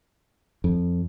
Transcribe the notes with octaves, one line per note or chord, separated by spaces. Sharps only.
F2